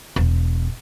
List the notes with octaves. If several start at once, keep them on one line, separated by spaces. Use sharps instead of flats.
E1